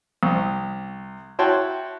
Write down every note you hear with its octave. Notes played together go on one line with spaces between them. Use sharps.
C2
E4 F#4 C#5 G5 A5 C6